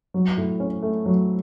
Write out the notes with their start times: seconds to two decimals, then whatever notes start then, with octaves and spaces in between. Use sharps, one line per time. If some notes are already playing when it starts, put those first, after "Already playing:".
0.14 F#3
0.37 A2
0.60 C#4
0.82 A3
1.06 F#3